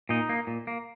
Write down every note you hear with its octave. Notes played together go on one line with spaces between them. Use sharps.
A#2 D#4
A#3
A#2
A#3